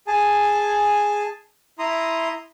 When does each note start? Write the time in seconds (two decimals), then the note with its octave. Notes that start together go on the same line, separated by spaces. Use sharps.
0.07 G#4 G#5 A5
1.79 E4 A#5 C6 D#6